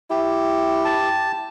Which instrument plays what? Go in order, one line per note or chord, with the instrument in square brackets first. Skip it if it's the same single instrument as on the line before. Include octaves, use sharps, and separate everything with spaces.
[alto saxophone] E4 [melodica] G4
[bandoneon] A5